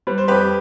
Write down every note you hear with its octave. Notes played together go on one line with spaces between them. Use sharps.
G3 B4
C5
F2 G4 B4